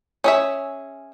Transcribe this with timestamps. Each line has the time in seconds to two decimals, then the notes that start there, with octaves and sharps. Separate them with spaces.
0.24 C#4 G#4 E5